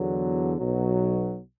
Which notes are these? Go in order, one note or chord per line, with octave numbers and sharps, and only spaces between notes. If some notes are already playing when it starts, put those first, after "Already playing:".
Already playing: E2 D3 F#3
B1 B2 F#3